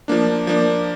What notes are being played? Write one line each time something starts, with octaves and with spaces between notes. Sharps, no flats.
F3 A#3 D4
F3 A#3 D4